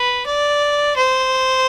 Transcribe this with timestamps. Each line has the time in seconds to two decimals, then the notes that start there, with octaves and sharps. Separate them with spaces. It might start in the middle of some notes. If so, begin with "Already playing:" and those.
Already playing: B4
0.26 D5
0.96 C5